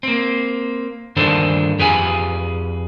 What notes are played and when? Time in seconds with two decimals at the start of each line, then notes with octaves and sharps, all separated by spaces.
0.03 A#3 C4
1.16 G2 D#3 D4 A4 C5
1.79 F2 G4 G#4 B4 G#5